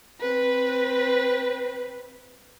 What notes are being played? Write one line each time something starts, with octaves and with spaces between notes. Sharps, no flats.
C4 B4